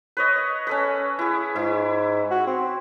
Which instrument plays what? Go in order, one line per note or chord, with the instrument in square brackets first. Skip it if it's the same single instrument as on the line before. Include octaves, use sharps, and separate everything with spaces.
[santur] B4 C#5 D#5
C#4 A4 B4
E4 G#4
[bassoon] G#2 [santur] E4
[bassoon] F#4
C4